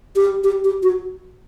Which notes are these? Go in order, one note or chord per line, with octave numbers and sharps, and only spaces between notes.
G4
G4
G4
F#4